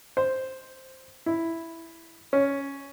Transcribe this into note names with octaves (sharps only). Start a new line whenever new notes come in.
C5
E4
C#4